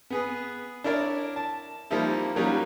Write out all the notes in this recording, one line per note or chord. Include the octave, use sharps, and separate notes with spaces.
B3 G#4 B4
D4 E4 A#4 C#5 D5
A5
F3 G3 A#3 D#4 E4
F#3 G3 A#3 C#4 D#4 F4